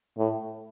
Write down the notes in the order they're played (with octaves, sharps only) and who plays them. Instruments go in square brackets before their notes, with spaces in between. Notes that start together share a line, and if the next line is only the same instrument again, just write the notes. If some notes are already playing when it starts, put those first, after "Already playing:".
[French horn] A2